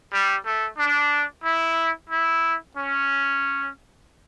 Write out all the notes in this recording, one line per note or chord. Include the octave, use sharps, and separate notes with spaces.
G3
A3
D4
E4
E4
C#4